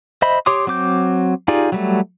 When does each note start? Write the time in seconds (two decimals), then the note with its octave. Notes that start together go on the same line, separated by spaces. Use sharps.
0.22 C5 D#5 E5 B5
0.46 G4 C#5 C6 D6 D#6
0.67 F#3 C4 D6 G6
1.48 D#4 F4 G4 G#4 D5
1.72 F#3 G3 A3